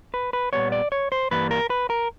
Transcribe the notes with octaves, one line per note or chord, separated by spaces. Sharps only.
B4
B4
A#2 G3 B3 C#5
D5
C#5
C5
G2 E3 G3 A#3 B4
A#4
B4
A#4